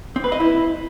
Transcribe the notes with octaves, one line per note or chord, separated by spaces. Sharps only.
C4
B4
D#5
E4